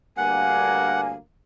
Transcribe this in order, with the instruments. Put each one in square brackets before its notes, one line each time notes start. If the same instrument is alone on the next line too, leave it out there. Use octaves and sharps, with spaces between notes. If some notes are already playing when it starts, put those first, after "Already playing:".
[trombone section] D2 G2 A#3 [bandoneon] F#5 [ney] G#5